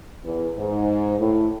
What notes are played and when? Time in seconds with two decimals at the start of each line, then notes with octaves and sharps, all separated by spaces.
0.25 E2
0.57 G#2
1.18 A2